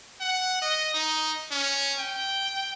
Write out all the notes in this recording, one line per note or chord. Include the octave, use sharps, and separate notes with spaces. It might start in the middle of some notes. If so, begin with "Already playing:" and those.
F#5
D#5
D#4
C#4
G5